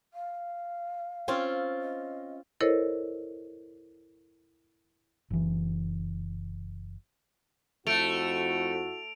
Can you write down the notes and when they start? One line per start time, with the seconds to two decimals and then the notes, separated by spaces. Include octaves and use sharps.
0.14 F5
1.28 C4 C#4 F4
1.81 D#5
2.60 E4 A4 A#4 C5 C#5 D#5
5.30 F#1 E3
7.87 F2 A3 E4 F#4 D7 F7